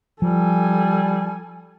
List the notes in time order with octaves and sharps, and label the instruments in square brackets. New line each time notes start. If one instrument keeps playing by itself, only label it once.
[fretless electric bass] F3 [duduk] G3 [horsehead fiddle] A4 G#5